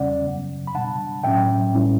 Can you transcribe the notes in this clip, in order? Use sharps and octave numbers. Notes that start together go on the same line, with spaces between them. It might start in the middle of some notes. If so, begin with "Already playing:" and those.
Already playing: E2 C#3 G3 C#4 D5 F#5
F#2 C#3 F#3 B3
B5
B2 G3 D4 F#5 A5
A2 F#3 C#4 E5 G5
A2 G3 C#4 E4